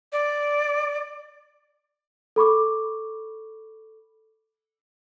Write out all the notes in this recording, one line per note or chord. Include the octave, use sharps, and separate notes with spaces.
D5
A4 B5 C#6 D6